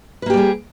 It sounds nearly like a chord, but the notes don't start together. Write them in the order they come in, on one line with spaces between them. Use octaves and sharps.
B4 A#3 G4 G3 G#4